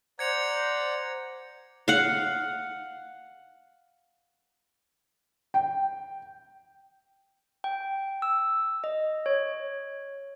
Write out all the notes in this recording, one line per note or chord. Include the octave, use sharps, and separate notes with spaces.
C5 D5 F#5 A#5 G#6 C#7 F7
F5 F#5
G5
G5
E6
D#5
C#5